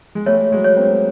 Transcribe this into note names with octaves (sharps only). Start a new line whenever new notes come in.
G#3
G3 A3 C#5
F#3 G#3
C#5
A#3 C4